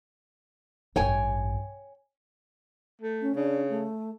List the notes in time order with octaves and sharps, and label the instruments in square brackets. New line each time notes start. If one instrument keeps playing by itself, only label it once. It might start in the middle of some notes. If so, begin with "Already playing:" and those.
[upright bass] A1 G2 [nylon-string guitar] C#5 G5 G#5
[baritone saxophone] A3
[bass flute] C#4
[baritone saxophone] C#3 [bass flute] D4
[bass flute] A3